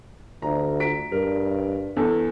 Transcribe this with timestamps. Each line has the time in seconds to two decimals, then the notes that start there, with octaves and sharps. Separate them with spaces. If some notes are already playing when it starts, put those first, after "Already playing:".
0.42 D2 A#5
0.80 A#5 B6 D7
1.12 G2 A#4
1.97 E2 A4